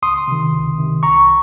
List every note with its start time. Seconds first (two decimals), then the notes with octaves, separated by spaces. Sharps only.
0.02 C#2 C6 D#6
0.28 C3 D#3
0.53 C#2
0.78 C3 D#3
1.03 C2 A#5 C#6